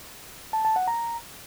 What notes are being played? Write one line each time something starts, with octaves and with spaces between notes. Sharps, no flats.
A5
A5
F#5
A#5